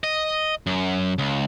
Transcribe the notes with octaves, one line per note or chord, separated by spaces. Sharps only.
D#5
F#2
C#2